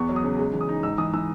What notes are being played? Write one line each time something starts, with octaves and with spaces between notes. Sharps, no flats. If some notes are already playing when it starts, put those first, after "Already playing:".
Already playing: E2 B3 C#6
F#3
D#6
C#3
G#3
E3
D#6
D#4
G#1 E6
E3 D#6
E3 E6